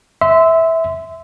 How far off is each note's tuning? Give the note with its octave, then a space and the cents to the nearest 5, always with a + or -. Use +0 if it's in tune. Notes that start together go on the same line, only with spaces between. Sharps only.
E5 -15 C6 -25